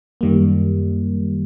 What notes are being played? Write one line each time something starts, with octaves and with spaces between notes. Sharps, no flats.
F#2 D#3 G3 A#3